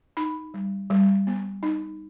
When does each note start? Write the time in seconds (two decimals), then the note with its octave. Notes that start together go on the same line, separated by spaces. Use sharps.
0.17 D#4 B5
0.54 G3
0.90 G3
1.27 B3
1.63 D#4